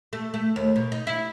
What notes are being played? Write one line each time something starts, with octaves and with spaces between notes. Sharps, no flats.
A3
A3
D#2
B2
D#4
E4